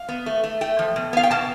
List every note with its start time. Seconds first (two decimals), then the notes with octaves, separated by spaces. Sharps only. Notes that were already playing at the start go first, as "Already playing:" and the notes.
Already playing: F5
0.09 B3
0.26 A3
0.44 A3
0.61 A3 G5
0.79 F3
0.96 B2
1.13 B3 F5
1.23 G5
1.31 B2 A5